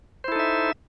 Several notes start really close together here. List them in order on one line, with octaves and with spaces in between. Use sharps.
C5 E4 A4 D#4 E5